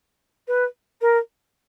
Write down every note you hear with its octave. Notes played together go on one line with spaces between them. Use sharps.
B4
A#4